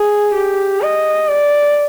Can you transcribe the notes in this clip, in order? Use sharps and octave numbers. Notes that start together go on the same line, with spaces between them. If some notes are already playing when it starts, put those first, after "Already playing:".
Already playing: G#4
G4
D#5
D5